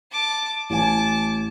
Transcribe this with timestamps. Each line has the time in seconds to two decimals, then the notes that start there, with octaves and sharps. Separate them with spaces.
0.11 A5 D6
0.70 A1 G#5 A5 D6